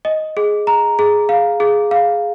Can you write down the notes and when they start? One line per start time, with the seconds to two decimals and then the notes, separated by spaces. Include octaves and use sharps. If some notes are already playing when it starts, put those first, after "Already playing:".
0.05 D#5
0.37 G#4
0.67 A#5
0.99 G#4
1.29 F5
1.60 G#4
1.91 F5